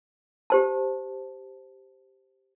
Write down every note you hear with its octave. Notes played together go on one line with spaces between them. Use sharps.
G4 C5 A5